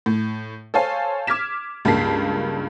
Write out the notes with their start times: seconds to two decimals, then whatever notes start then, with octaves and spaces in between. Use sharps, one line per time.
0.06 A2
0.74 A4 C5 C#5 F5 G#5
1.27 D6 F6 G#6 B6 E7
1.85 C#2 G2 A#3 A5 B6 C7